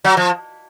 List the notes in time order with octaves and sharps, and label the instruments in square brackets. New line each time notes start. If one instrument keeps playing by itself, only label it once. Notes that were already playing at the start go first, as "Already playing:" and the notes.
[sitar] F#3
F3